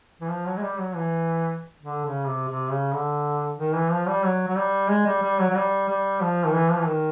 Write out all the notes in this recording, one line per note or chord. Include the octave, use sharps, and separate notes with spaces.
E3
F3
F#3
G#3
G3
F#3
E3
D3
C#3
C3
C3
C#3
D3
D#3
E3
F3
G3
F#3
F#3
G3
G#3
G3
G3
F#3
F#3
G3
G3
F3
D#3
E3
F3
E3
D#3